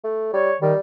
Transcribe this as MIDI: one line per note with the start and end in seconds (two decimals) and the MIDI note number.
0.04 0.31 57
0.33 0.52 55
0.33 0.55 73
0.62 0.73 51
0.62 0.79 55